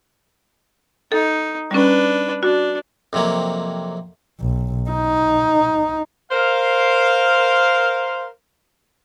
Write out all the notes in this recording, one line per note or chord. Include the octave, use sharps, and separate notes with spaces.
D#4 A4
G3 C#4 D4 B4
D4 F#4
F2 C3 F#3 A#3
B1
D#4
A#4 C5 F5